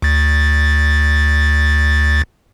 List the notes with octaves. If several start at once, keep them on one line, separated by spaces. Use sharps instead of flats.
D2 A6